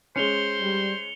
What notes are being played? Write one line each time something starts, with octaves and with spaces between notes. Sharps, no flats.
G#3 C#4 C5 C#7 F7 G7
G3